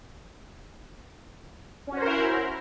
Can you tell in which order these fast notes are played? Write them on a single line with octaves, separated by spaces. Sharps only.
C#4 F#4 C5 A#4 E4